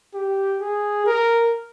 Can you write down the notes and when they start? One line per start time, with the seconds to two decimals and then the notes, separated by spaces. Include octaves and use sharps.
0.15 G4
0.61 G#4
1.06 A#4